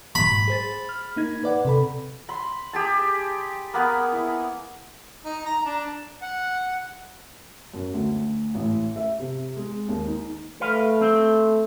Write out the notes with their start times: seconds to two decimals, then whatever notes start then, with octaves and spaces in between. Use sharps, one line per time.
0.15 G#2 F#3 B5
0.48 G#4 C5 A6
0.89 F6
1.16 A#3 D#4 G#6
1.44 B4 D5 F#5
1.65 C3 A4 B5
2.29 B5 C6
2.73 G4 G#4 A5
3.74 A#3 B3 G#4
4.13 E4
5.25 D#4
5.46 A#5
5.65 D4
6.22 F#5
7.74 F#2
7.94 D2
8.55 A1
8.96 E5
9.20 C3
9.56 G#3
9.88 D#2
10.07 D#4
10.61 A3 B4 F5
11.01 C4